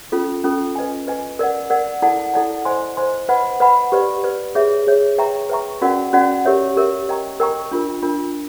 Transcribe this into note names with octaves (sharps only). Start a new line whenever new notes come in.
C#4 F4 A4
C#4 F4 A4
B4 D#5 G#5
B4 D#5 G#5
A#4 D5 F#5
A#4 D5 F#5
E4 A4 D5 F#5 A5
E4 A4 D5 F#5 A5
C5 D#5 G#5 C6
C5 D#5 G#5 C6
B4 D#5 F#5 B5
B4 D#5 F#5 B5
G4 B4 D5
G4 B4 D5
G#4 C#5 E5
G#4 C#5 E5
B4 E5 G5 A#5 C#6
B4 E5 G5 A#5 C#6
C#4 F#4 A#4 D5 F#5
C#4 F#4 A#4 D5 F#5
G4 A#4 C#5 E5
G4 A#4 C#5 E5
A#4 D#5 G5 A#5 C#6
A#4 D#5 G5 A#5 C#6
D4 F4 A#4
D4 F4 A#4